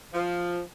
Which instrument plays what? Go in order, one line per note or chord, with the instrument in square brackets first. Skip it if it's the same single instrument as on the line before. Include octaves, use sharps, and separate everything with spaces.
[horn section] F3